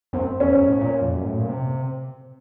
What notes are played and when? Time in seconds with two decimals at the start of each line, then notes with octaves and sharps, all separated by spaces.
0.13 F#2 C4
0.40 F2 C#4
0.54 F#2
0.68 A2
0.81 A#2
1.02 F2
1.14 F#2
1.25 A2
1.38 A#2
1.49 C3